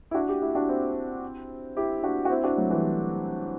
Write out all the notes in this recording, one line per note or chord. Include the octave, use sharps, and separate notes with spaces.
E4
D4 F#4
E4 G4
E4 G4
D4 F#4
C4 E4
E4 G4
D4 F#4
F#4
C4 E4
D4 F#4
F#3 A3
E3 G3